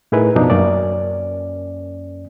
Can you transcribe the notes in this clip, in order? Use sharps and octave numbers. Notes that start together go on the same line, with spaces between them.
A2 D#4 E4 G#4 A#4 B4
F#2 B2 F3 D4 D#4
F#2 A#3 C#4 D5